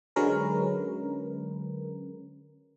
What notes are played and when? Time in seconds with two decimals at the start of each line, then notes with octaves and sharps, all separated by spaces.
0.16 D3 F#3 G#3 C#4 A#4 B4